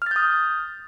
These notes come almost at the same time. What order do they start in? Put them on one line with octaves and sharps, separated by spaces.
F6 A6 G6 D#6